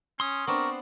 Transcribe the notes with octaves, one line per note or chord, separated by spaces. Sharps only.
C#4 C6 D#6
B3 C4 D4 A#4 C#6